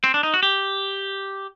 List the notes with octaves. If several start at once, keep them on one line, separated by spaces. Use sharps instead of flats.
C4
D4
D#4
F#4
G4